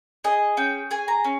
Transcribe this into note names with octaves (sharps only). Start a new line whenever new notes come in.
G#4 D#5
C#4 G5
G#4 G#5
A#5
C#4